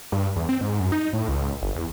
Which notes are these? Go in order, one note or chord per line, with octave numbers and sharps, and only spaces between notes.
G2
E2
C4
G#2
F#2
D#4
A2
C#2
G1
E2